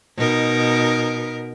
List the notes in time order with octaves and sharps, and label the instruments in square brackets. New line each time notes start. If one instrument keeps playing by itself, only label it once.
[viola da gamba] B2 D#4 A#4